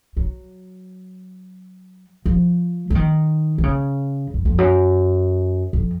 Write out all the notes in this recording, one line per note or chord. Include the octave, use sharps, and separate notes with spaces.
F#3
F3
F3
D#3
D#3
C#3
F#2
F2
F#2
F2